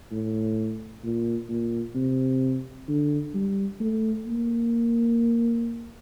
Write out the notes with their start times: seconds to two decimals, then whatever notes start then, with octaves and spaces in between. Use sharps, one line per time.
0.11 A2
1.04 A#2
1.49 A#2
1.95 C3
2.88 D3
3.35 G3
3.80 A3
4.27 A#3